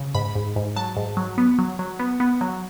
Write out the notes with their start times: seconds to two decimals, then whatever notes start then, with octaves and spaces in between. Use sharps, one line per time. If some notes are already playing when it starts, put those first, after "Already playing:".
Already playing: C#3
0.15 G#2 B5
0.35 G#2
0.56 G#2
0.76 F#3 A5
0.96 G#2
1.17 F#3
1.38 B3
1.59 F#3
1.79 F#3
1.99 B3
2.20 B3
2.41 F#3